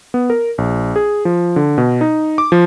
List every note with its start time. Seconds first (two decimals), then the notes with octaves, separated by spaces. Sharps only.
0.14 B3
0.30 A#4
0.58 A#1
0.96 G#4
1.25 F3
1.56 D3
1.78 B2
2.01 D#4
2.38 D6
2.52 F3